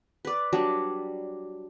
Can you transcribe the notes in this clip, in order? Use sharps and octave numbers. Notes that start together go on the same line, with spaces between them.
B4 D5
F#3 G3 D4